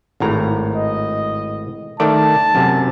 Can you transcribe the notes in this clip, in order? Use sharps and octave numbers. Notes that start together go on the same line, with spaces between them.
G#1 A2 A#5
D#5
D#3 A3 D5 A5
F#2 C3